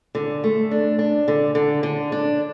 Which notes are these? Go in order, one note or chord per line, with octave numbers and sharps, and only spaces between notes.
D3
A3
D4
D4
D3
D3
D3
D4